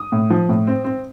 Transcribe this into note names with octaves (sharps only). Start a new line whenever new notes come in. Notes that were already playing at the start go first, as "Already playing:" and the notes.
Already playing: D#6
A2
F3
A2
C4
C4